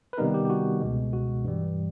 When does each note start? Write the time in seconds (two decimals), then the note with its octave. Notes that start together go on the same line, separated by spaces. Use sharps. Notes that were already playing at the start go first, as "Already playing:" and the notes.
0.13 B4
0.18 C3 D#3 G3 B3 D#4 A#4
0.34 G4
0.45 G4
0.50 F#4
0.81 C#2 B2 G#3
1.13 F#4
1.44 G2 E3 G3